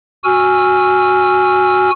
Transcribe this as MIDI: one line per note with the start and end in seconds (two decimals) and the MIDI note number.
0.24 1.91 66
0.24 1.91 80
0.24 1.91 88
0.24 1.91 89